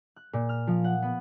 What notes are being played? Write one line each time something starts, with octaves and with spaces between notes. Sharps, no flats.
F#6
A#2
F6
F3
F#5
B3